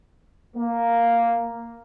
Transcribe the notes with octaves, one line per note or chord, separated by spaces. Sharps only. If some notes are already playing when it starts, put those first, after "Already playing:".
A#3